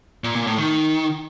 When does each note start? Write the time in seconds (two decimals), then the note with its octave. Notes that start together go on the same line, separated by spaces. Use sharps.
0.24 A#2
0.35 A#2
0.47 A2
0.58 D#3